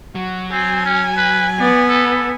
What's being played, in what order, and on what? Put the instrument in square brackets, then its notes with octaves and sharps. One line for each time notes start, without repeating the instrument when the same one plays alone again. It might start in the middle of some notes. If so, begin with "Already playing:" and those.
[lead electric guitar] F#3 [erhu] F#4
[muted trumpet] C4 [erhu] G#5
[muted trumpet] C#4
B4
[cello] B3 [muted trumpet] D5
[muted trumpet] A4